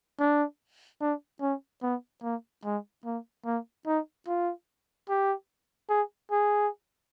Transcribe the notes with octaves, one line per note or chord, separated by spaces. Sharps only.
D4
D4
C#4
B3
A#3
G#3
A#3
A#3
D#4
F4
G4
G#4
G#4